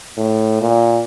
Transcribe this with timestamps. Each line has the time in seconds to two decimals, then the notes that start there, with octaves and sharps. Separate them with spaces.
0.17 A2
0.61 A#2